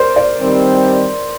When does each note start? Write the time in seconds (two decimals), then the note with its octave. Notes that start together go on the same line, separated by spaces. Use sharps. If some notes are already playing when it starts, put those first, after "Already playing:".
Already playing: A#4 C5 D5
0.16 D5
0.38 D#3 G3 C4